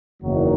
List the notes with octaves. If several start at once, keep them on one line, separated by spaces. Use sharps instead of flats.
F#1 E2 D#3 F#3